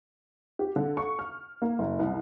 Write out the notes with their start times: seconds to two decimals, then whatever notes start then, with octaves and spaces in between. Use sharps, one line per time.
0.59 G4
0.76 D3
0.97 C#6
1.19 F6
1.62 A#3
1.79 F#1
1.99 C2